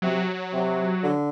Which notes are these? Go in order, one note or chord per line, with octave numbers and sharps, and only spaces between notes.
C3 F#3
C3
D3